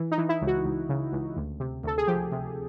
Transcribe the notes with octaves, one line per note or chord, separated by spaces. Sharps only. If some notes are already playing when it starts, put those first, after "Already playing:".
Already playing: E3
D#4
E3
E4
C#2
F#4
C#2
C#3
C#2
D2
C3
D2 A4
G#4
F3 G4
C3